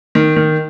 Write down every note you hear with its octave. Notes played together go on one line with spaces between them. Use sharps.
D#3
D#3